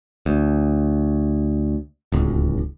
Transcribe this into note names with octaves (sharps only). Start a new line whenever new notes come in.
D2
D1 C#2